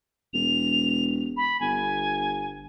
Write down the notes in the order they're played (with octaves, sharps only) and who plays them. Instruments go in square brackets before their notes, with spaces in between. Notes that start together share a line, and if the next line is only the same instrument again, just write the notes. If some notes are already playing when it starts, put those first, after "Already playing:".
[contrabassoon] E1 [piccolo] F7
[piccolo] B5
[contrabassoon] G1 [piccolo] G#5